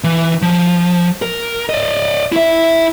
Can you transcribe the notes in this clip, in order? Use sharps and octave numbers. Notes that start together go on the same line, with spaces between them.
E3
F3
A#4
D5 D#5
E4 E5